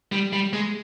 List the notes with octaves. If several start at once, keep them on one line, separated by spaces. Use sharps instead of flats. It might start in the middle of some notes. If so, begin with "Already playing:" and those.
G3
G3
G#3